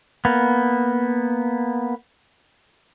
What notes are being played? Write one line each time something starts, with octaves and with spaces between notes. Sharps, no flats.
A#3 B3